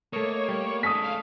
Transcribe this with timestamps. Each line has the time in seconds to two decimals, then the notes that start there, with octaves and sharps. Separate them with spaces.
0.13 A3 A#3 C#5 D#5
0.48 G3
0.83 G#3 C#4 A4 D#6 B6
1.04 F5